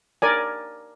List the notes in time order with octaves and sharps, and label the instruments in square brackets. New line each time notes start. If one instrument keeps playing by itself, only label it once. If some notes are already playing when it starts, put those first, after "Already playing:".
[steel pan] A#4 D5 G#5